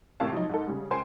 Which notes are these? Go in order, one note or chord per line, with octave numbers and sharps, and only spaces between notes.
G#1 A2 C3 F5 A5
F3 F#3 D#4
G#2 D#4 A4
C#3 G3
C#2 C5 G#5 C7 D7